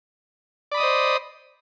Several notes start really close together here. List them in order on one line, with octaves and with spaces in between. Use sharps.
D5 B5 D#6 D#5 C5